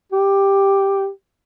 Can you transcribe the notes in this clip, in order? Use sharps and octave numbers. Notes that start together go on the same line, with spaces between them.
G4